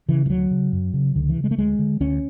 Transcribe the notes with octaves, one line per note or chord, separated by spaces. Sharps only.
C#3 E3
E3
D2 F#3
C#3
F#2
C#3
C#2 D3
E3
C#3
G#3
A3
D2 G#3
D3
D2 C#4